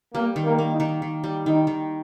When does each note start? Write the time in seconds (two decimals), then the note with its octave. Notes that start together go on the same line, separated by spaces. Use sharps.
0.14 G3 A#3
0.36 D#3
0.44 A#3
0.59 A#3
0.72 D#4
0.80 D#3
1.02 D#3
1.24 G3
1.46 D#3 D#4
1.67 D#3